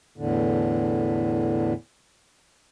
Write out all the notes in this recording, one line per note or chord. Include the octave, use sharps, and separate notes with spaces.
E2 A2 D3